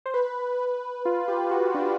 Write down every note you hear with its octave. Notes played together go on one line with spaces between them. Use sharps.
C5
B4
B4
F4
G4
F4
F#4
D4